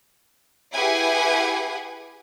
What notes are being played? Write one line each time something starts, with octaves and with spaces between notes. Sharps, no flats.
E4 G4 G#4 B4 F#5 G#5